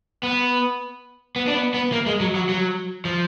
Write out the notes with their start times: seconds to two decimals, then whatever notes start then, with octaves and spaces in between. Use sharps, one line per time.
0.23 B3
1.36 B3
1.48 D4
1.54 B3
1.74 B3
1.92 A#3
2.06 G#3
2.20 F#3
2.35 F#3
2.49 F#3
3.05 F3